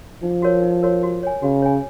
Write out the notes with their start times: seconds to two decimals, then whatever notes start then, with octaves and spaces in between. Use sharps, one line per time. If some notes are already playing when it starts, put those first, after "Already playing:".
0.23 F3 D#4
0.42 F#4 A#4 C#5
0.63 D#4
0.83 F#4 A#4 C#5
1.03 F#4
1.23 C#5 G#5
1.42 C#3 F#4
1.62 C#5 G#5